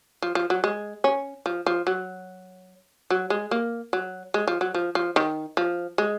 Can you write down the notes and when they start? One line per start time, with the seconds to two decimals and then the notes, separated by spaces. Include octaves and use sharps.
0.22 F3
0.35 F3
0.50 F#3
0.64 G#3
1.04 C#4
1.46 F3
1.66 F3
1.87 F#3
3.10 F#3
3.30 G#3
3.51 A#3
3.93 F#3
4.34 G#3
4.48 F3
4.61 F#3
4.74 F3
4.95 F3
5.16 D#3
5.57 F3
5.98 G#3